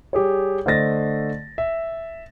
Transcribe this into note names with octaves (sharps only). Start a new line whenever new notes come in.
G3 G4 G#4 C#5
D3 A3 C5 D#5 A6 A#6
E5